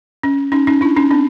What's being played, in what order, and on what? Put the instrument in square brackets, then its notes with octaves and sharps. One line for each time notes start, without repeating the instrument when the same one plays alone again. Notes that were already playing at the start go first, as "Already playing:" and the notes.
[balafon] C#4
C#4 D#4
C#4 D#4
D4 E4
C#4 D#4
C4 D4